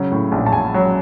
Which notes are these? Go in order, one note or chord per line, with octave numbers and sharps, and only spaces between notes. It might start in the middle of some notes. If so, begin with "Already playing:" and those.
Already playing: C#3 F#3
A2
A#1
A5
A#1 G#5
F#3